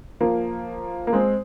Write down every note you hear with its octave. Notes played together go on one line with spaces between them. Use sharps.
F3 A#3
A#3
G#3 C4